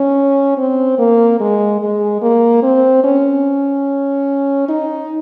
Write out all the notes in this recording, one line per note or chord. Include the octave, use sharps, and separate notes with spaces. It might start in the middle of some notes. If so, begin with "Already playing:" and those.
Already playing: C#4
C4
A#3
G#3
G#3
A#3
C4
C#4
D#4